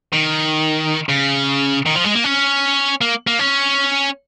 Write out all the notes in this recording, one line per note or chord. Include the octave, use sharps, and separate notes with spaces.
D#3
C#3
D#3
F3
G#3
A#3
C#4
A#3
A#3
C#4